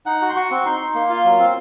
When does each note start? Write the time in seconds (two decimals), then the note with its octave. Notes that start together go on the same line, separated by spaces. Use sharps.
0.06 D#4 F#5
0.22 F#4
0.29 C6
0.36 F#4 C#6
0.51 C4
0.66 D#4 C6
0.80 D#4
0.95 A#3
1.09 F4
1.24 F#3
1.39 C4